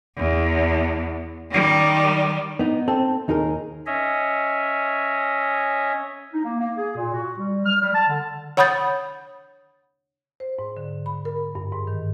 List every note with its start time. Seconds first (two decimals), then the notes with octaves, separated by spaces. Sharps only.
0.17 E2
1.51 D#3 G3
2.59 B3 D#4
2.88 C4 A4
3.28 D#2 D#4 G#4 A#4
3.86 C#4 C#5 D#5 E5
6.33 D#4
6.44 A#3
6.61 A#3
6.77 G#4
6.97 A#2
7.13 F#4
7.38 G3
7.66 F6
7.81 G3
7.94 A5
8.09 D3
8.57 C#5 F#5 B5 D#6 G6 A6
10.40 C5
10.59 G#2
10.77 D3
11.06 B5
11.25 A#4
11.55 G2
11.72 G#2
11.87 D#3